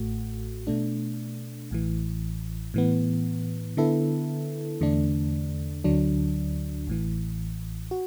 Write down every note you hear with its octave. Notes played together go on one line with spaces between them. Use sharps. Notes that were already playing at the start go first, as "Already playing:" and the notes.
Already playing: A1 A2 A3 F#4
B2 A3 D4
A1 A2 E3
A2 E3 B3
D3 B3 E4 A4
E2 D3 A3 D4
D2 D3 F#3 D4
A1 A2 E3
F#4